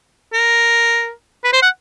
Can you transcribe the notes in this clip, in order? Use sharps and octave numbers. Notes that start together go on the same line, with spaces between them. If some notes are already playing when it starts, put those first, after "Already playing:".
A#4
B4
C5
F#5